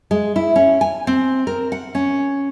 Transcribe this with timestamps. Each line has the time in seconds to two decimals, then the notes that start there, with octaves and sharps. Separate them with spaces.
0.11 G#3
0.36 E4
0.56 C#4
0.81 G#5
1.07 C4
1.47 A#4
1.72 F#5
1.95 C#4